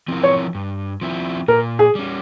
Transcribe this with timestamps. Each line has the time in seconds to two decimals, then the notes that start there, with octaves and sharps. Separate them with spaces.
0.08 F3 C4 E4 A#4
0.24 C#5
0.55 G2
1.01 F3 C4 E4
1.48 A#2 A#4
1.79 G#4
1.95 G3 C#4